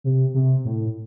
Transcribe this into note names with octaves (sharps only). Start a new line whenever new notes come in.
C3
C3
A2